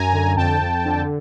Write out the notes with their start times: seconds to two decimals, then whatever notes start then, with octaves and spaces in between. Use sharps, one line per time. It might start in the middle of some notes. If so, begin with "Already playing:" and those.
Already playing: F#2 G#5 A#5
0.13 D3
0.36 F2 G5 A5
0.61 F2
0.85 D3